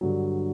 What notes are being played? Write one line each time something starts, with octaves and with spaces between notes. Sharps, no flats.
G2 D3 F#3